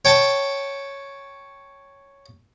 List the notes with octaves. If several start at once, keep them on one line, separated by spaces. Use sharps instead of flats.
C#5 G5 A5